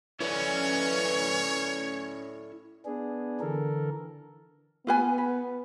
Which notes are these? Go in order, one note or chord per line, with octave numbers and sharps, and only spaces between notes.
E3 C#4 E4 A4 C#5 D5
B3 D4 G#4
D3 E3 A4 A#4
B3 F4 B4 G#5
B4